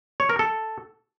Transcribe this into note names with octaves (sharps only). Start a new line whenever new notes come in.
C#5
A#4
A4